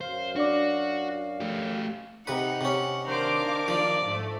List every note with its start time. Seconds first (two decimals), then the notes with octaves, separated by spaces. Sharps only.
0.01 F#2 C5 F5
0.36 D4 F#4 D5 D6
1.40 A3 G4
2.27 C3 D#4 B4 F#5
2.61 C3 C#4
3.07 D#3 D4 A#4 C5 F5 D6
3.68 F3 D5
4.05 G#2 A3